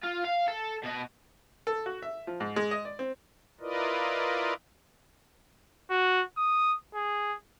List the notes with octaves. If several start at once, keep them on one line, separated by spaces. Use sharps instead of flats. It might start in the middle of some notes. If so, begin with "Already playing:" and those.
F4
F5
A4
B2 D#5
A4
F#4
E5
F3
G#2
G#3
D#5
D5
C4
E4 F4 A#4 B4 D5 D#5
F#4
D#6
G#4